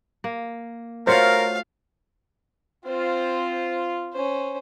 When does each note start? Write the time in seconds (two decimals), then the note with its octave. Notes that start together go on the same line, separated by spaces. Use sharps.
0.24 A#3
1.07 A3 F4 F#4 A#4 C5 C#5 F5
2.85 C4 F4 C5
4.13 C#4 C5